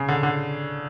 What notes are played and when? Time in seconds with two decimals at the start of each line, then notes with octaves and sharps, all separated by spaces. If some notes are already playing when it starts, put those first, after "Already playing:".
Already playing: C#3
0.08 D3
0.23 D3